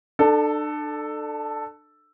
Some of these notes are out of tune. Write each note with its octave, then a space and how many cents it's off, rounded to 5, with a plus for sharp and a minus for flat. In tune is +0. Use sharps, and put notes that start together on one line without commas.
D4 +35 A4 +0